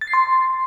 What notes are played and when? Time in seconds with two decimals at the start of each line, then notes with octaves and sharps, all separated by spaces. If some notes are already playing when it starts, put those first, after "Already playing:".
0.01 A6
0.07 C7
0.14 C6